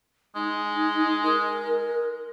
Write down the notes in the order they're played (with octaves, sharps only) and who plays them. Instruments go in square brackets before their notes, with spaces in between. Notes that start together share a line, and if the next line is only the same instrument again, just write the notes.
[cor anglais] G#3 [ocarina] D#4
[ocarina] A#4